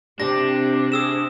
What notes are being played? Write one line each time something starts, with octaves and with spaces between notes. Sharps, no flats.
C3 D4 G4 A#6
G4 G#4 D#6 E6 E7